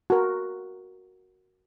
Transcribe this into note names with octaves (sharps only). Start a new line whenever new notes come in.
F#4 A#4